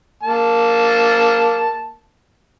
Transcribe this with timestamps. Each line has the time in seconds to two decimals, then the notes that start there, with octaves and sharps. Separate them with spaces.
0.23 A#3 A5